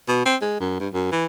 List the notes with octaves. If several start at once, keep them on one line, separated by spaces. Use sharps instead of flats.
B2
C4
G#3
F#2
G2
F#2
E3